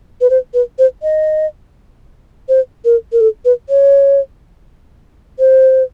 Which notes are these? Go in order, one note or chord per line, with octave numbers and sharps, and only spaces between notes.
B4
C5
B4
C5
D#5
C5
A#4
A#4
A4
B4
C#5
C5